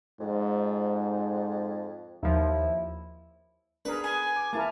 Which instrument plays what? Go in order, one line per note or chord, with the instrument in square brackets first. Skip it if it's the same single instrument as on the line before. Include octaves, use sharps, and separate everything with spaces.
[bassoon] F2 [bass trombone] G#2
[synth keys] D#2 F3 [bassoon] E4
[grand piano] B3 G#4 [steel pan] D4 A#4 [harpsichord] B4
[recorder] G#5
[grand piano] D6
[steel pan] A#3 E4 A#4 [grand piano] F5 A5 A6